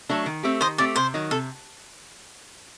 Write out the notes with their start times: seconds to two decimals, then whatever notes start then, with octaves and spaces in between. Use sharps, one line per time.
0.09 F#3 A3 D4 A4
0.26 D#3
0.43 A3 C4 G4
0.61 D#3 C5 D#5
0.78 A3 C4 G4 D5
0.96 C3 C5
1.14 D#3 F#3
1.31 C3 A4